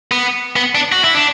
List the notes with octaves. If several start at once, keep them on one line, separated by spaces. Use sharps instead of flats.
B3
B3
D4
F#4
E4
D4